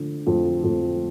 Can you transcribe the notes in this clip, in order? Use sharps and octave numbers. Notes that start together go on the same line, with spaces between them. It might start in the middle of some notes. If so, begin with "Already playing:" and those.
Already playing: D3 F3
F2
F2